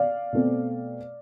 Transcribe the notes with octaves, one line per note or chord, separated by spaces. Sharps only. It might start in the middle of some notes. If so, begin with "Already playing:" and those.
Already playing: D5 F5
B2 A3 C4